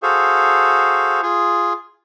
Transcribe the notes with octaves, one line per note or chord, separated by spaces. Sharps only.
F#4 G#4 A4 C5 F5
F4 G#4